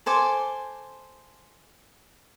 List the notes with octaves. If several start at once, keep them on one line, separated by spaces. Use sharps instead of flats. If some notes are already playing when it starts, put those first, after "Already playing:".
A4 C5 G#5 D6